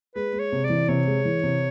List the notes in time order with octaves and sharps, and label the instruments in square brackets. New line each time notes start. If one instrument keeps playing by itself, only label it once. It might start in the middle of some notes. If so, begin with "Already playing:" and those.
[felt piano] G#3 [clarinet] B4
[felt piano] G#3
[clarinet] C#5
[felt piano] C3
[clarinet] D5
[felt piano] E3
[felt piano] C3 [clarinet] C#5
[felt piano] G#3
E3
C3